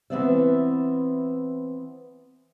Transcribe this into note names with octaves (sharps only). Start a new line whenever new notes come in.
E3 F#3 B3 C4 D5 E5